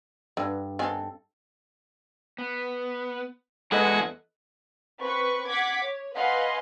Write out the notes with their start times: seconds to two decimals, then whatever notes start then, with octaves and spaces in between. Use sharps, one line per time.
0.37 G2 D3
0.79 D#3 B3 C4 A4 G#5
2.38 B3
3.72 E2 G#3 D4 F#4 A4 B4 D#5 F#5
5.00 C4 B4 C#6
5.48 F#5 D6 G#6 B6 C#7
5.84 C#5
6.16 B4 D#5 F5 F#5 G#5 C6